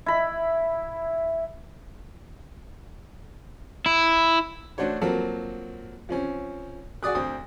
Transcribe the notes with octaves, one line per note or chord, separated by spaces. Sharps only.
E4 B5
E4
A3 D4 F#4 C5 C#5
F3 F#3 A#3 C4 A4 A#4
F3 C4 C#4
F#4 G#4 D5 D#6 F#6
D2 C4 D#6